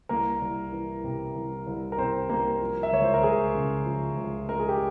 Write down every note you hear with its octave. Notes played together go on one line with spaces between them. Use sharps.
C2 A#3 A#4
C2
E3
C3
C2
C2
A#4
C3 C4 C5
C2 A#3 A#4
F3
E5
C#2 C#5
C5
A#4
C#2 G#4
C#3
F3
C#2
G#3 A#4
G#4
G4